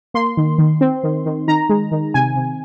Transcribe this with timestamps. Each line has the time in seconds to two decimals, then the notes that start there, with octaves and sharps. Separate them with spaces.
0.14 A#3 C6
0.37 D#3
0.58 D#3
0.81 C4
1.04 D#3
1.26 D#3
1.48 D#3 A#5
1.69 G#3
1.92 D#3
2.14 C3 G#5
2.36 C3